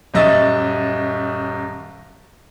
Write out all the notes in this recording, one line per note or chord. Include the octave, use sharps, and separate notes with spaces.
D#1 F#2 D#5 E5 A6